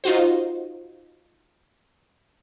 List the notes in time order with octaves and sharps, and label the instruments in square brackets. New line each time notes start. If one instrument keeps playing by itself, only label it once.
[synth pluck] D#4 F4 F#4 C5